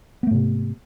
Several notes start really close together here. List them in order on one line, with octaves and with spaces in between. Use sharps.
B3 A3 G#2 C3